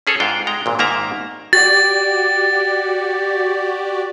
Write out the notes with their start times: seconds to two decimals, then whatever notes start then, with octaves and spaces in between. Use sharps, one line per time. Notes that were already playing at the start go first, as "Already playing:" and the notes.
0.07 C#4 G#4 A4 C#5
0.20 G#2 D4 F4 F5 G5
0.47 G#3 G5 A#5
0.66 G#1 A#2
0.79 G#2 D#3 A#3 D5 E5 A#5
1.53 F#4 G4 D5 A6